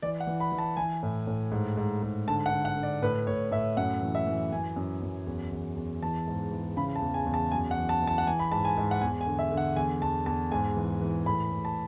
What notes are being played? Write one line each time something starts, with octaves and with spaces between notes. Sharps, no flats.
E3 D5
F#5
E3
B5
E3
A5
E3 G#5
A2
A2
G#2
G#2
G#2
D3 A5
F#5
D3
F#5
D3
D5
A2 B4
A2 C#5
A2 E5
F#2 F#5
E3
E5
E3
F#2 G#5
F#2
F#2
E2
E2
E2
E3 A5
G#2
E3
C#3 B5
A5
E2
G#5
E2
A5
F#2 G#5
F#5
E3
A5
E3
A5
F#5
E3 G#5
B5
G#2 A5
G#5
G#2
F#5
E2 G#5
G#5
D3
E5
D3
F#5
E2 G#5
E2 A5
E2 A5
G#2 G#5
E3
E3
A2 B5
A2
A5